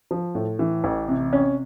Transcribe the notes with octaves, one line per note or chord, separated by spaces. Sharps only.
F3
A2
E3
A1
C3
C#4